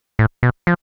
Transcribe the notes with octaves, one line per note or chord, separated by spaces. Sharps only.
A2
B2
F3